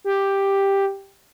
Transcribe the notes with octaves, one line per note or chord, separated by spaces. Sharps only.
G4